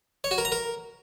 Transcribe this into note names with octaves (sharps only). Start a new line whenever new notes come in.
C#5
F#4
A#4
A#5
A#4